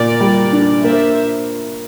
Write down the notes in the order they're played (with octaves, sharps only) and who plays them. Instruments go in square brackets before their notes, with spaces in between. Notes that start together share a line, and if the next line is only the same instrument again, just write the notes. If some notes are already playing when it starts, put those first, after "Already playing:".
Already playing: [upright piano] A#2 [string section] A#4 D5
[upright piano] G3
D4
[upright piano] A#3 [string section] C5 E5